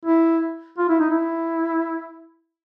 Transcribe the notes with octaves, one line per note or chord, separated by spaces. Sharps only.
E4
F4
E4
D#4
E4